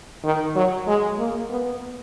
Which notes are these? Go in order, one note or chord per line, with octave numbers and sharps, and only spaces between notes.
D#3
F#3
G#3
A#3
B3